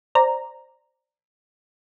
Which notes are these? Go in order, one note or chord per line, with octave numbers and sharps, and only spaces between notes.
C5 D5 A#5